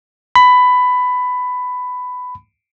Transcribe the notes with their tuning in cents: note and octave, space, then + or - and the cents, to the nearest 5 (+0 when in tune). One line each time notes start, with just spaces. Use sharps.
B5 +15